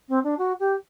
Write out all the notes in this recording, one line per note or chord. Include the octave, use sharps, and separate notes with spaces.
C4
D4
F#4
G4